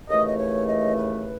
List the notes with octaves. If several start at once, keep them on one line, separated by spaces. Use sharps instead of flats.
D#2 C#3 E3 A3 D#5
D#5
C#5
D#5
B4